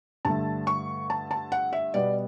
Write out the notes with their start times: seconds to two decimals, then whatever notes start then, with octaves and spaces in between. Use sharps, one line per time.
0.25 G2 D3 A3 A5
0.67 C#6
1.10 A5
1.31 A5
1.52 F#5
1.73 E5
1.94 B2 G3 B3 D5